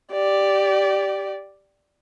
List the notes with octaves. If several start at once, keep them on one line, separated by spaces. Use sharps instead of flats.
G4 D5